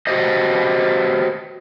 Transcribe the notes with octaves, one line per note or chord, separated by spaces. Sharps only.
F#4 G4 C5 D#5